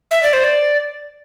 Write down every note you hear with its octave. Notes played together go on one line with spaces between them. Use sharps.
E5
D5
C5
D5